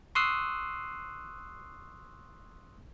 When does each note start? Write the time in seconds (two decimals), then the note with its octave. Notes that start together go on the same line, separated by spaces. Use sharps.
0.15 C6 C#6 D#6 E6 F#6 C7